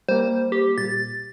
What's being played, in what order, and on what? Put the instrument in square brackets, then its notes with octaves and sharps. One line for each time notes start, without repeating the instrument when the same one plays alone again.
[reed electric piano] G3 A#3 [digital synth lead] C5
[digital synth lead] G4
[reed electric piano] A#2 [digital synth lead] A6